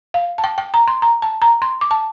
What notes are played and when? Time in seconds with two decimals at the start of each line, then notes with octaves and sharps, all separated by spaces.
0.14 F5
0.38 A5
0.44 G5
0.58 G5
0.74 A#5
0.88 C6
1.02 A#5
1.22 A5
1.42 A#5
1.62 C6
1.81 D6
1.91 A5